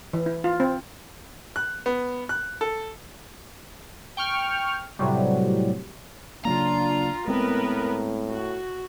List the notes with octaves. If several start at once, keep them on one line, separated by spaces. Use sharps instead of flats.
E3
E4
F4
C4
F#6
B3
F#6
A4
G5 C#6 F6
A2 C3 F#3 G3
C#3 F#3 A#3 D4 F4 A#5
A2 G#3 B3 C4 A#4 B4
F#4